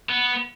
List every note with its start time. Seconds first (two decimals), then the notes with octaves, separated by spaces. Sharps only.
0.10 B3